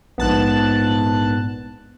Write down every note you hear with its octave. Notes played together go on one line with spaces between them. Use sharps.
A#1 G#2 B3 A5 F#6